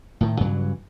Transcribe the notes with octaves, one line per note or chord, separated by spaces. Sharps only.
A2 D#3
G2 C#3 E3 F#3